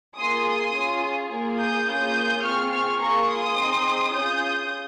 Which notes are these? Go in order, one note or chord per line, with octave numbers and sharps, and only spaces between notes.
A#3 F4 G#4 C6 D#6
C6 D#6
C#4 F4 G#4
A#3 F4 G#4
D#6 G6
A#3 C#4 F4 G#4 D#6 G6
C4 F4 G#4 C#6 F6
C#6 F6
A#3 F4 G#4 A#5 C#6
C6 D#6
C4 D#4 G#4
C#4 F4 G#4 D#6 G6